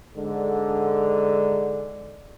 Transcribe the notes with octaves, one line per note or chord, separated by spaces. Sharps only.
G#2 D3